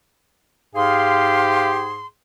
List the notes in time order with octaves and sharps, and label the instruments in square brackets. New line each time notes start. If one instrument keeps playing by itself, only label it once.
[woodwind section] G#2 G#4 C6 [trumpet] G4 [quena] F5